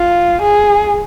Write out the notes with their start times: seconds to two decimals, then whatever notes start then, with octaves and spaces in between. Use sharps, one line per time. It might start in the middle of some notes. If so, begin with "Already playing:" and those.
Already playing: F4
0.42 G#4